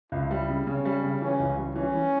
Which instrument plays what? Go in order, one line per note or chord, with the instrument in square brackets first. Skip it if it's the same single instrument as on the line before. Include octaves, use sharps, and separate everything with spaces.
[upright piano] C#2 [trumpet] E4
[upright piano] G3
C#3
[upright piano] C#3 [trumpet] C#4
[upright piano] G3
C#3
[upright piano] E3 [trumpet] C#4
[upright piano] C#2
G3
[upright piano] E3 [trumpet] C#4
[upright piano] E3